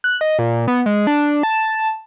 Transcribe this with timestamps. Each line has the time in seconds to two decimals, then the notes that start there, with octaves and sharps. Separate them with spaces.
0.04 F#6
0.21 D#5
0.39 A#2
0.68 B3
0.86 G#3
1.07 D4
1.43 A5